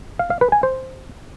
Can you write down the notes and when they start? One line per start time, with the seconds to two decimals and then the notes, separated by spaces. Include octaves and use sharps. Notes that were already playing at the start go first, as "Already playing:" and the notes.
0.19 F5
0.30 F5
0.41 B4
0.52 G#5
0.63 C5